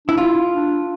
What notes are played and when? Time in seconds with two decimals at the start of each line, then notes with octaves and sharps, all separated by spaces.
0.07 D4 E4
0.17 E4 F4
0.52 D4